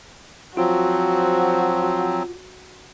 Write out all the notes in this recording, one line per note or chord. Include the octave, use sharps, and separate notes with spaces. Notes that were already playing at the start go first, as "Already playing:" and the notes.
F3 F#3 C4 F4 F#4